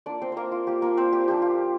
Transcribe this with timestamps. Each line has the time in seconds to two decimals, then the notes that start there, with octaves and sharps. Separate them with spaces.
0.06 A#3 D4 F4 D5
0.22 C4 C5
0.32 A#3 A#4 C5
0.52 F4
0.67 A#3 F4 G4
0.82 A#3 A#4
0.97 C4 C5
1.12 G4
1.28 F3 D4 F4 G4
1.42 F4